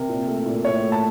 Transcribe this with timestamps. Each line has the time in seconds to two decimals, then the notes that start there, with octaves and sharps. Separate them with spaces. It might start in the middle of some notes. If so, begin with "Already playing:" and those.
Already playing: C3 A#4
0.09 A#2
0.27 A3
0.46 A#2
0.64 A2 C#5
0.83 A3
0.92 A5